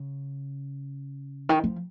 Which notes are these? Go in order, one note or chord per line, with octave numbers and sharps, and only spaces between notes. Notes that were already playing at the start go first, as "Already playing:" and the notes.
Already playing: C#3
D#3
F3